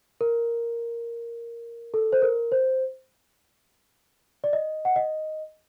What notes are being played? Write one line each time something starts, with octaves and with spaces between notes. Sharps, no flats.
A#4
A4
C5
A#4
C5
D5
D#5
F#5
D#5